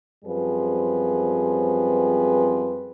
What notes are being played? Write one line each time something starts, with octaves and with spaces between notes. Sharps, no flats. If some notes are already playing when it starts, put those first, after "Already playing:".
F#2 F3 G3 C4 G#4 B4